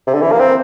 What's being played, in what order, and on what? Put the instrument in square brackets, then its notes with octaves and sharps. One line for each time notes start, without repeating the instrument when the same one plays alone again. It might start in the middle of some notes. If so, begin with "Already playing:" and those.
[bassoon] C3
D3
E3
A#3
C4